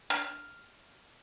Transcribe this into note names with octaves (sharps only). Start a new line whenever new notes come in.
F6